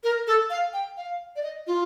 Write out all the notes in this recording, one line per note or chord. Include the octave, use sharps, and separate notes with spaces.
A#4
A4
F5
G5
F5
D5
D#5
F4